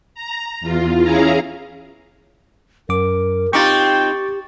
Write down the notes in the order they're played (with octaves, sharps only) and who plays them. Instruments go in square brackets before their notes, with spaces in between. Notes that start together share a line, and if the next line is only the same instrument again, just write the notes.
[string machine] A#5
E2 F4
C#4 E4 G#4 F5 A#5
[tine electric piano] F#2 D6 [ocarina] A#4
[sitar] C4 D#4 F4 [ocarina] G4 [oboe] G5 [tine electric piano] C#6 D6 A6